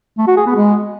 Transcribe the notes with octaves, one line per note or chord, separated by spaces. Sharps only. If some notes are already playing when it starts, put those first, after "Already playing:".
A3
F#4
G#4
B3
G#3